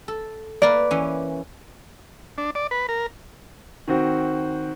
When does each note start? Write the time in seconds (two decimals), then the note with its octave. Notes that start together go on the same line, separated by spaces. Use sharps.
0.08 A4
0.62 A#3 A#4 B4 D5
0.91 E3 C#4
2.38 D4
2.55 D5
2.71 B4
2.89 A#4
3.88 D#3 C4 F#4